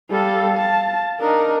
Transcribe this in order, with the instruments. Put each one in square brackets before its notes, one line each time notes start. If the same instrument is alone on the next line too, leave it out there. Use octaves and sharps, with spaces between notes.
[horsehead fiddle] G3 A4 [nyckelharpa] F5
[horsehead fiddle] A5
[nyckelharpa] D4 D#4 [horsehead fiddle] A#4